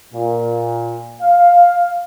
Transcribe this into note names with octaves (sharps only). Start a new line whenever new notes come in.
A#2
F5